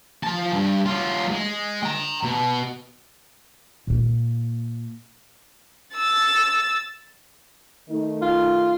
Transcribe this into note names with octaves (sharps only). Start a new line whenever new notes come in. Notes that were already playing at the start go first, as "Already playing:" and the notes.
F3 A5
G2
F#3 F4
G#3
G5 A#5
B2
A#2 A#3
E6 A6
D#3 A3 D#4
F4